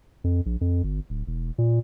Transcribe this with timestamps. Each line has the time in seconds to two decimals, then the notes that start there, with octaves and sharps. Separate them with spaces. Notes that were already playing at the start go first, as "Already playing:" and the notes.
0.24 F2
0.46 A#1
0.61 F2
0.84 G1
1.10 D1
1.27 E1
1.58 A#2